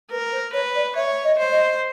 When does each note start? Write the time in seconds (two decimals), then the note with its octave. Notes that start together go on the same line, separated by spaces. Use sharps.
0.12 A#4 B4
0.32 C5
0.53 B4 C#5
0.76 D5
0.96 C#5 E5
1.24 D#5
1.38 C5
1.52 D#5